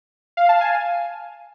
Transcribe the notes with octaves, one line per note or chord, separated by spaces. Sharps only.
F5
A5
G#5